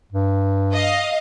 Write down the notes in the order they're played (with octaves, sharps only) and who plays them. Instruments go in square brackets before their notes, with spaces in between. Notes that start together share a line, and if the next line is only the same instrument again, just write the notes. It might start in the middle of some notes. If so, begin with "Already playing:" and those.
[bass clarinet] G2
[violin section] D#5 F5